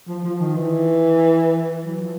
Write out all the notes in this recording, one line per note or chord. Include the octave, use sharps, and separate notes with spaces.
F3
F3
D#3
E3
F#3
F3